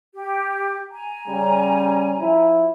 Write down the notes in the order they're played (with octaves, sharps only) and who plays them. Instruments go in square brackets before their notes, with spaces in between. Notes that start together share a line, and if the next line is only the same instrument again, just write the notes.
[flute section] G4
G#5 A#5
[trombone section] C#3 G3 C#4
F3 E4